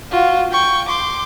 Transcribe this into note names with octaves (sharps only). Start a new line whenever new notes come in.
F4 F#4
G5 C#6
C6 D6